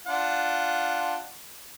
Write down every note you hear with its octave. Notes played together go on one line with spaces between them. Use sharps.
D4 F4 F#5